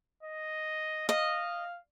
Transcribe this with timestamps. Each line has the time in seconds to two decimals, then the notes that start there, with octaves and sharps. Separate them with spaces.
0.23 D#5
1.09 D#5 F5